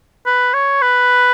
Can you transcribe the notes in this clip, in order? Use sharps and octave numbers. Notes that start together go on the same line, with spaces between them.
B4
C#5
B4